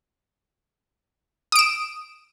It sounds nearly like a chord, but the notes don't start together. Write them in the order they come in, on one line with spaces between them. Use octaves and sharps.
D#6 D7 E7